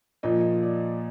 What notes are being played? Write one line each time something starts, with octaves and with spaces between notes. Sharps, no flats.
A#2 F3 D#5
D#5
D5